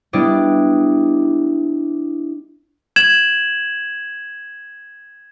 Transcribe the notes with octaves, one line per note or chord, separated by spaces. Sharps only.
G3 B3 D4 E4 D5 D#5
G#6 E7 F#7